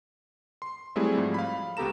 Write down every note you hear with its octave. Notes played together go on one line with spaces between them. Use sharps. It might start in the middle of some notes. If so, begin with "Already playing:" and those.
C6
F#3 G3 A3 C4 E4 G#4
G#2 F3
F5 B5
C#2 B3 G4 A4 A#5 E7